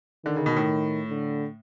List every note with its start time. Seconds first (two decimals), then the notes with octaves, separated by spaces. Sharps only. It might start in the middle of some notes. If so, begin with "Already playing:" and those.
0.25 D3 D#3
0.36 C#3
0.46 B2
0.57 A2
1.09 D3